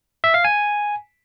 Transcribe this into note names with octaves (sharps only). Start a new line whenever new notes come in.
E5
F5
G#5